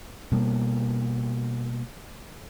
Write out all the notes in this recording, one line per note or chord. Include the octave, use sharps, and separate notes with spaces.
B2 G3 A#3